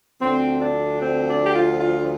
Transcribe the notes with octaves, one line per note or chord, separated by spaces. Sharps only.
D2 D3 F3 C4
D4
C4
D4
G4
F4
F4